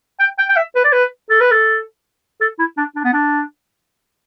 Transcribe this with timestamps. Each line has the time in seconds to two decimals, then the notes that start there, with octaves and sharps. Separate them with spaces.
0.20 G5
0.38 G5
0.49 G5
0.56 E5
0.75 B4
0.84 D5
0.92 B4
1.30 A4
1.41 B4
1.51 A4
2.41 A4
2.59 E4
2.77 D4
2.96 D4
3.04 B3
3.13 D4